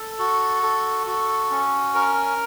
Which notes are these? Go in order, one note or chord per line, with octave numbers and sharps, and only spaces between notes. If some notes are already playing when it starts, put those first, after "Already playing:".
Already playing: A4
F#4
A4
F#4
C#4
A#4